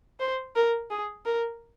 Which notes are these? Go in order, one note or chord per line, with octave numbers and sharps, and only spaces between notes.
C5
A#4
G#4
A#4